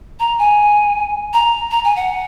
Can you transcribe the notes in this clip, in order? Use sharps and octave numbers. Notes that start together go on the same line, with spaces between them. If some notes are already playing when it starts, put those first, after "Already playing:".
A#5
G#5
A#5
A#5
G#5
F#5